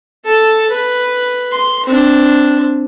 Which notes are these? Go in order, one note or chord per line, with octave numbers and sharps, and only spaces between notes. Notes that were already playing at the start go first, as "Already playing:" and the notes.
A4 A5
B4
C6
C4 D4